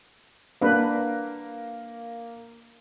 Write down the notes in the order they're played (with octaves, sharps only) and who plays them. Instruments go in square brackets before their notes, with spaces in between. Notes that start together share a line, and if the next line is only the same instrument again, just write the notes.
[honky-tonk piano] A#3 [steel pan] D4 B4